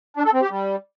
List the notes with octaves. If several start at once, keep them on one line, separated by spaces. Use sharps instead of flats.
D4
A4
C4
G4
G3